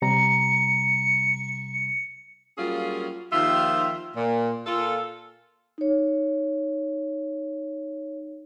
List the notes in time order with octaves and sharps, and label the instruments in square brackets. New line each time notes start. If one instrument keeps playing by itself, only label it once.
[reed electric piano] C3 G3 A#5 [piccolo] C#7
[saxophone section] F#3 G3 A#3 C#4 F4 G#4
D#2 D#3 F3 F4 E5
A#2
A#2 F4 A4
[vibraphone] D#4 C#5